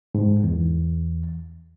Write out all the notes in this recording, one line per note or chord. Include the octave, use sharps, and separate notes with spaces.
G#2
E2